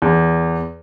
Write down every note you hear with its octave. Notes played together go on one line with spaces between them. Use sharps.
E2